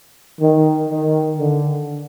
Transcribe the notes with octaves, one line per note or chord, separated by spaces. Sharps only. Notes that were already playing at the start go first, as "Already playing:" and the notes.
D#3
D#3
D3